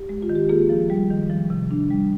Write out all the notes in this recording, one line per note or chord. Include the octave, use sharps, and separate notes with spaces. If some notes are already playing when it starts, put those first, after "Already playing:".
Already playing: G4
G#3
F4
D#3
G4
A#3 F4 G#4
F3
G3
D#3
F3
C3
D4
G3